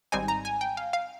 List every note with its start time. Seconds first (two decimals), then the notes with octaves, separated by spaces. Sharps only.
0.12 G#1 G#2 G3 C4 D#4 G#5
0.28 A#5
0.45 G#5
0.61 G5
0.77 F5
0.93 F5